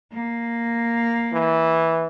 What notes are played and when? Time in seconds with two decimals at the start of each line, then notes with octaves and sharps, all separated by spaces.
0.12 A#3
1.32 E3